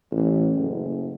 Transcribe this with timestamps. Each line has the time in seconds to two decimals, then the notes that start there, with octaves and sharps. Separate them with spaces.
0.11 A1
0.56 F#1